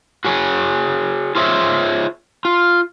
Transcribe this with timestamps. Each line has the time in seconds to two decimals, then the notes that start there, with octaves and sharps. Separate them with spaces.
0.25 F#4 G#4 C#5
1.35 F4 G#4 C5 C#5 E5
2.45 F4